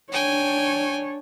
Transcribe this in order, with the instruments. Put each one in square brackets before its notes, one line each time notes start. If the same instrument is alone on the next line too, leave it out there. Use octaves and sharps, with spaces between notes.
[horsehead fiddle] D4 C#5 [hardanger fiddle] G5 G#5